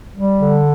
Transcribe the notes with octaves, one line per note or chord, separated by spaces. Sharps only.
G3
D3